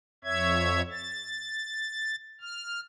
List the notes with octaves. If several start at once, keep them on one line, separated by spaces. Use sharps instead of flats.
F2 C#5 E5 G#6
A6
F6